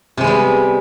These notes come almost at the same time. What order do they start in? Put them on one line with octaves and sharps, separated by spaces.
C3 G#3 B3 G3